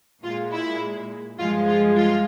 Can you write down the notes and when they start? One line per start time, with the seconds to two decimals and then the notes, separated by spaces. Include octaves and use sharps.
0.23 A#2 G#3 F4
0.52 E4
1.38 G2 F3 G#3 F4
1.67 F4
1.96 F4